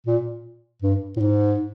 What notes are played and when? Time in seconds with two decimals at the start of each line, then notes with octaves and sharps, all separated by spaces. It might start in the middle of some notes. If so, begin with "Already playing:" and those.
0.07 A#2
0.82 G2
1.17 A2
1.20 G#2